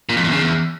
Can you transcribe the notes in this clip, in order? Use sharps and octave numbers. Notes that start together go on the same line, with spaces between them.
A#2
F2
E2
C#3
E2